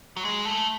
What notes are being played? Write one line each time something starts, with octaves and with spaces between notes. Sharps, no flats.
F#3
G#3
A3